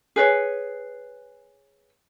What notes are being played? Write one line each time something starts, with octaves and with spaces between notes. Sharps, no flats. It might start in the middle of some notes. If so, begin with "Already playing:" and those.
G#4 B4 C#5